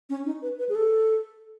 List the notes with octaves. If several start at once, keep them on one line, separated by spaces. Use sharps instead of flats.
C#4
D#4
B4
B4
G#4
A4